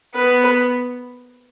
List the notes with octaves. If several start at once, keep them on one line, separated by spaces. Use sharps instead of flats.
B3 B4